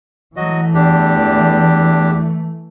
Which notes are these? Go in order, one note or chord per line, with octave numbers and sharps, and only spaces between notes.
E3 F#3 A3 F#4 D#5
E2 D4 G4